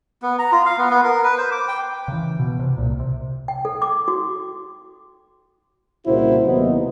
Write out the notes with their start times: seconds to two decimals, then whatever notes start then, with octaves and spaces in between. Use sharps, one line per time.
0.22 B3
0.39 A#5
0.52 F4
0.66 F5
0.78 B3
0.90 B3
1.04 A#4
1.23 B4
1.38 C5
1.52 D6
1.68 G5
2.08 C#3 E3
2.39 B2
2.59 C3
2.78 C2 A#2
3.00 C3
3.48 G5
3.65 A4
3.82 D6
4.08 F#4
6.05 C2 A#2 C#3 E4 F#4 C5
6.45 D#2 C3 F#3 B3 D#4